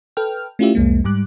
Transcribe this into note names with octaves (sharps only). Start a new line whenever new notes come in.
A4 B4 G5 F6
A3 C#4 E4 F4 G4 E5
C2 F2 G#3 A#3
G#2 G3 D6 F#6